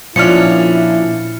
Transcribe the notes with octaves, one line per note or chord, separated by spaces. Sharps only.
A#2 F3 C#4 D4 E4 F6 C#7